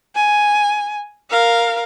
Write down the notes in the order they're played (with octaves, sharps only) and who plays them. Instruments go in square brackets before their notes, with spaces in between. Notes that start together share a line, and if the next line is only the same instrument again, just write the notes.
[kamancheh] G#5
A#4 F5